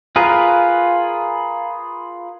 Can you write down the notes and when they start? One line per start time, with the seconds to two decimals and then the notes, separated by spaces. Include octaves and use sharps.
0.16 F4 G#4 A#4 B4